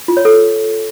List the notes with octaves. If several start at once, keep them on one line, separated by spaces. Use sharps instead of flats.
F4
C#5
A4